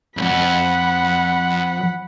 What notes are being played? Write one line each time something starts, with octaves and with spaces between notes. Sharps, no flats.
B1 F2 F#5 B5